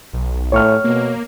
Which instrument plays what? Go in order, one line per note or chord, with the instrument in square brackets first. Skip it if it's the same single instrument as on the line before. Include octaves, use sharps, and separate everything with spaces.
[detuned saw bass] B1
[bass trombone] A2 [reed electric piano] C#5 C#6 F6
[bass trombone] B2 [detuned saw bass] A#3